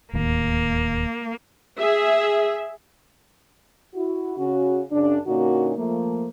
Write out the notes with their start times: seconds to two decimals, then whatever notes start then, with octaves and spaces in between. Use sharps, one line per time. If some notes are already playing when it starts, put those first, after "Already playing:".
0.13 D1 D#2 A#3
1.78 G#4 E5
3.95 E4 F#4
4.37 C#3 C#4 F#4
4.92 F#2 C#3 D4
5.27 A#2 D3 A#3 C#4 D#4 F#4
5.77 F3 A3 A#3